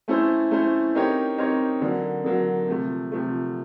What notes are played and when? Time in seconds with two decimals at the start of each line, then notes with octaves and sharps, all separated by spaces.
0.08 A3 C#4 E4 A4 C5
0.51 A3 C#4 E4 A4 C5
0.95 C4 D#4 G4 A#4 C#5
1.38 C4 D#4 G4 A#4 C#5
1.81 D3 F#3 A#3
2.24 D3 F#3 A#3
2.67 C3 F3 A3
3.12 C3 F3 A3